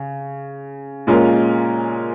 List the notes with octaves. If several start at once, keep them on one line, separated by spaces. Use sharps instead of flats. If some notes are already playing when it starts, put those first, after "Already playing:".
Already playing: C#3
A#2 G#3 C#4 F4 A#4